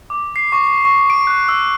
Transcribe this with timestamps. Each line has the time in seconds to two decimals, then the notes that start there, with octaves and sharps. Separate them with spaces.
0.10 D6
0.36 C7
0.52 C#6
0.85 C#6
1.10 D7
1.27 F#6
1.49 E6